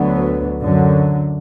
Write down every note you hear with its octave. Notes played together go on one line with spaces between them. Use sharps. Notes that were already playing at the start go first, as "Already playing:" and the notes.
Already playing: D2 D3 F#3 B3
F#2 D3 F#3